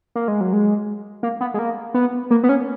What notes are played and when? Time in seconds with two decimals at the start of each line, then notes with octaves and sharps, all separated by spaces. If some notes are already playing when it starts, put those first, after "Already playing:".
0.16 A#3
0.28 G#3
0.41 F#3
0.53 G#3
1.23 A#3
1.41 B3
1.54 G#3
1.59 A#3
1.94 B3
2.31 A#3
2.43 B3
2.49 C#4